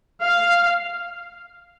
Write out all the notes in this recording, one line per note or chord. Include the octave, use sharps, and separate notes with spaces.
F5